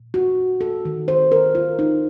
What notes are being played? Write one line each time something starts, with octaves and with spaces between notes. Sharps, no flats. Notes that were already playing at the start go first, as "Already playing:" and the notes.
Already playing: A#2
F#4
A4
D#3 A3
C5
A#4
F4
D#4